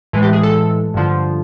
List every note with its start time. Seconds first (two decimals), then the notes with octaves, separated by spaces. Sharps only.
0.13 A2 E3 G#3
0.23 G4
0.33 G#4
0.43 A4
0.94 G2 D3 F3